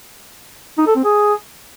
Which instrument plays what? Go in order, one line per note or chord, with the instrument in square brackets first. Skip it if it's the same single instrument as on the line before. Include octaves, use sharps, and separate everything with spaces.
[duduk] D#4
A4
C4
G#4